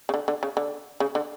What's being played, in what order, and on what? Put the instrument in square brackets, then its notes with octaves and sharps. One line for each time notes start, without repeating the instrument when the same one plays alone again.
[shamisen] C#3
D3
D3
C#3
D3
C#3
D3